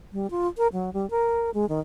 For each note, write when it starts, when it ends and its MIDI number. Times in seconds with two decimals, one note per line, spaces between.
0.13 0.27 55
0.31 0.47 65
0.57 0.67 70
0.72 0.92 54
0.93 1.09 55
1.10 1.50 70
1.54 1.68 56
1.69 1.79 51